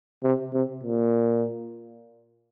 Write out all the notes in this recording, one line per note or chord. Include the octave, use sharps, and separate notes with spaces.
C3
C3
A#2